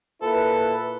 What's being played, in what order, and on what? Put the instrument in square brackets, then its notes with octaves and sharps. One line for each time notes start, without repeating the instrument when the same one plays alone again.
[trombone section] A#2 E4 B4 [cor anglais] A4